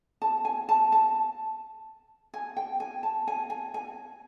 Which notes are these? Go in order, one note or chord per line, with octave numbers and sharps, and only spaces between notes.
A5
G#5
A5
A5
G#5
G5
G#5
A5
G#5
G#5
G#5